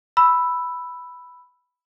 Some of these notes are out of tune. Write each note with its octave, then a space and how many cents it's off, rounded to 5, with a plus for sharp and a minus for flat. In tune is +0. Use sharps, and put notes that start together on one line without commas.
B5 +0 E6 +0